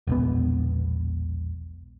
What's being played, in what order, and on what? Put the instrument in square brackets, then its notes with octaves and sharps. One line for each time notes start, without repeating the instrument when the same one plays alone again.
[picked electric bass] E1 A#1 B3